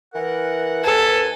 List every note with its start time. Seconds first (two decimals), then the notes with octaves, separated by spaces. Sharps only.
0.14 E3 A#4 F#5
0.84 D#2 A4 B4 G#5